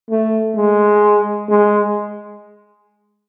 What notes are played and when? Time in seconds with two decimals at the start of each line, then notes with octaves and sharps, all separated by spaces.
0.10 A3
0.56 G#3
1.49 G#3